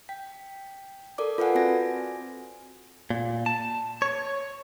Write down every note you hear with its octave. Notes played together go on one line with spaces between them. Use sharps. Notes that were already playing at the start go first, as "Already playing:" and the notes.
G5 B6
A4 A#4 D5 D6
F4 A4 B4 D5 F#5 G#5
C4 F#4 G#5 A#6
A#2
A5
C#5